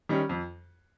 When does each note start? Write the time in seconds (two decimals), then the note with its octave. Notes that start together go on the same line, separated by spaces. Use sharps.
0.09 D#3 G3 C#4
0.29 F2